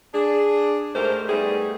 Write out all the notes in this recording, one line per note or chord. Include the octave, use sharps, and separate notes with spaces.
D4 G#4
G#2 A3 G4 A#4 C5
G3 A3 B3 D#4 G#4